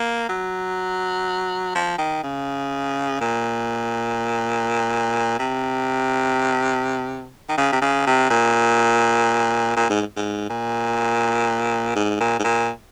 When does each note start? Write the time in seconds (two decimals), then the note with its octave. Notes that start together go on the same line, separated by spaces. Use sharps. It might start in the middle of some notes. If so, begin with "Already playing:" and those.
Already playing: A#3
0.29 F#3
1.75 F3
1.98 D#3
2.24 C#3
3.21 A#2
5.39 C3
7.49 D#3
7.57 C#3
7.72 C3
7.81 C#3
8.07 C3
8.30 A#2
9.76 A#2
9.90 G#2
10.17 G#2
10.50 A#2
11.96 G#2
12.20 A#2
12.39 G#2
12.44 A#2